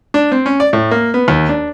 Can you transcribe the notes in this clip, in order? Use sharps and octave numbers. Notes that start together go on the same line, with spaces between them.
D4
C4
C#4
D5
A2
A#3
B3
D#2
D4